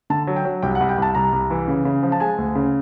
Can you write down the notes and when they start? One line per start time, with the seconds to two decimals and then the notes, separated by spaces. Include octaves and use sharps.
0.10 D3 A5
0.27 F#3
0.36 G5
0.45 F#3
0.63 C2 G5
0.75 F#5
0.80 C2
0.89 G5
0.98 C2 A5
1.15 C2 A#5
1.33 C2
1.51 E3
1.68 C#3
1.85 C#3
2.03 F3
2.12 A5
2.20 G#3 G#5
2.38 D2
2.55 C#3